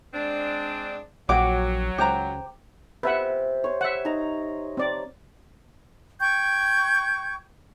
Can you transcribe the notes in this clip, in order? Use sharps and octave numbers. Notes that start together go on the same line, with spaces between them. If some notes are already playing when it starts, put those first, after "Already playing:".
G#3 C4 D4
A#1 F#3 G4 C#5 F#5 D6
C#2 G4 C5 A#5
C3 B4 E5 F#5
C5 C#5
E5 F#5
D#4 A#5
C4 D5
G5 C#6 G6 G#6